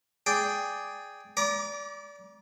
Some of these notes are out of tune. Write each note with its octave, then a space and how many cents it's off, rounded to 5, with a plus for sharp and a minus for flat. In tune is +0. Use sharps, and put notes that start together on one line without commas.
G#4 +0 D5 +0 G5 +0
D5 -25 A#5 +35 D6 +0